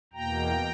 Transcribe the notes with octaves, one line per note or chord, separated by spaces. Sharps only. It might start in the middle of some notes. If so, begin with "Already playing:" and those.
E2 B2 A#3 G5 A#5